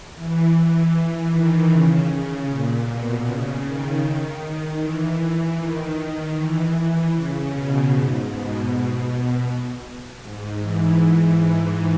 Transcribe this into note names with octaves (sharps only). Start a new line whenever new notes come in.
E3
D#3
C#3
A#2
B2
C#3
D#3
E3
E3
D#3
D#3
E3
C#3
B2
G#2
B2
B2
G#2
E3